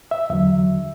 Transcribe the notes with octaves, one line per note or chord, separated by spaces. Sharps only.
E5
E2 D3 F#3 E5